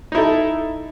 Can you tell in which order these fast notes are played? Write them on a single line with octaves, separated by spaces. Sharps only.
D#4 E4 A4